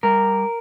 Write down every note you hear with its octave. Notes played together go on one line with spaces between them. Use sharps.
G3 A#4